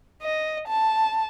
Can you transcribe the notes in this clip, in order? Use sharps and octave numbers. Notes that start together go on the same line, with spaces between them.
D#5
A5